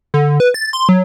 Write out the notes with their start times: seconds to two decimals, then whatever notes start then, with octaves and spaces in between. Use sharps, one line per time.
0.14 D3
0.40 B4
0.54 A6
0.73 C6
0.89 F#3